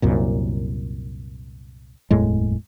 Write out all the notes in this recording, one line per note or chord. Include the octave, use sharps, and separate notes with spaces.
C2 F#2 A#2
F#1 E2 A2 G#3